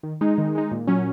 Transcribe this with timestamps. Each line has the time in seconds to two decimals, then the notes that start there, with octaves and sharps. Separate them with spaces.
0.03 D#3
0.21 G#3 D#4
0.38 D#3
0.55 G#3 D#4
0.72 A#2
0.87 F#3 C#4